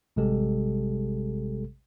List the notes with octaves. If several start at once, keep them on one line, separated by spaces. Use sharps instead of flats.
A1 C3 G3 G#3 G4 A4